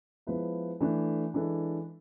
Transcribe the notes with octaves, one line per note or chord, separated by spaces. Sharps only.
F3 G#3 B3 E4 B4
E3 A3 D4
E3 G#3 D4 A4